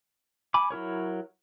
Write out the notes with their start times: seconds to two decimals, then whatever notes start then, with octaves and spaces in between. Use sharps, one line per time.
0.54 G#5 B5 D6
0.70 F#3 E4 A#4 C#5